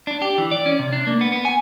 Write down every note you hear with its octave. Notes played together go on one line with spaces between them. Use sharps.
D4
G4
E3
D5
C#4
C3
D4
A#3
B3
B3
G#5